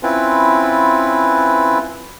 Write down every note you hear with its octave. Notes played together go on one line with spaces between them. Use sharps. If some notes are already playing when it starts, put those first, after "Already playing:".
C4 C#4 E4 F4 B4